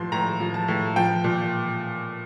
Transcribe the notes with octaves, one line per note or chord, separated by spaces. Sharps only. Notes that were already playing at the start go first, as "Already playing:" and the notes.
Already playing: A2 F3 C6
A2 A#5
F3
A5
A2
F3 G5
A#2